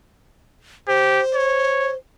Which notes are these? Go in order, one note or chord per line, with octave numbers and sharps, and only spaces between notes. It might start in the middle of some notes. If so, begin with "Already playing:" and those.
G4 C5
C#5